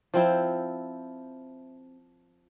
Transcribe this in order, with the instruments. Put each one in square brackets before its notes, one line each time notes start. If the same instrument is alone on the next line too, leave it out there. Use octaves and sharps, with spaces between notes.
[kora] F3 C4 E4